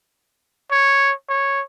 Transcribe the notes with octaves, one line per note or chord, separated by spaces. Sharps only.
C#5
C#5